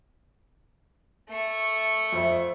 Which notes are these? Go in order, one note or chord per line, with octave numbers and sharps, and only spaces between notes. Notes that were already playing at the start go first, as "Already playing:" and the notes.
A3 C#6
F2 C5 E5